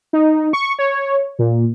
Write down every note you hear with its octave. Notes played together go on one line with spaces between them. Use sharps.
D#4
C#6
C#5
A#2